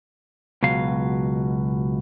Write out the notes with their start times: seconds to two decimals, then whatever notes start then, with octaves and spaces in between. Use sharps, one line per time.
0.63 C#2 B2 F#3 F5